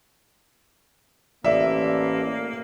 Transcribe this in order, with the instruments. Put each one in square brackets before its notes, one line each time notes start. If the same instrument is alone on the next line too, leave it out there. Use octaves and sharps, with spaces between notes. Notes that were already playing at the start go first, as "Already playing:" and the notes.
[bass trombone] A1 [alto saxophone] A#3 [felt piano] D5 [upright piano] E5